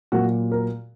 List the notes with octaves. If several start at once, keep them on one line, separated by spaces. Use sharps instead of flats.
A#2 F#3 A#3 F#4
A#4